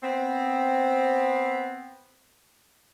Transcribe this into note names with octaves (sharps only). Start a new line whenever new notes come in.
B3 C4